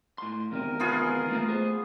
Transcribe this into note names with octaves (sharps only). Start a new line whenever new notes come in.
A2 C6
E2 C3 D#3 A#4
B3 F4 G#4
A3 A#3 A#5
A3 G#4 C5